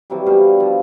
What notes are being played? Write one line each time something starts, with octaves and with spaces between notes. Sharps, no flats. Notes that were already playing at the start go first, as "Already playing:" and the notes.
C3 E3 F#3 G3
B2 D3 G3 F5
F3